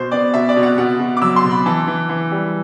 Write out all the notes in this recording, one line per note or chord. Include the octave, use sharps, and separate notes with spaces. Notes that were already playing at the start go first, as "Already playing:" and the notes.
Already playing: B2 C5
B3 D5
B2 E5
D5
B2
F#5
B2 F#5
B2
D6
F#3 E6
C6
B2
B5
E3 A5
E3
E3
G3